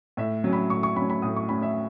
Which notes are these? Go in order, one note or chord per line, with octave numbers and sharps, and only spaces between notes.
A2 E5
F#3 C#4
B5
A2 C#6
C#6
F#3 C#4 B5
B5
A2 D#6
C#6
F#3 C#4 B5
E5